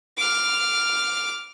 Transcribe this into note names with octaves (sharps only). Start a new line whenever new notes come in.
D6 F6